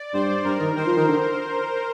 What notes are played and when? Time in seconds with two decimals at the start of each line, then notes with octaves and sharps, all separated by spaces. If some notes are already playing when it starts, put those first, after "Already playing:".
Already playing: D5
0.14 G2 C5
0.45 G2 A#4
0.60 D#3
0.76 D#3 C5
0.86 F3
0.97 D#3
1.08 D3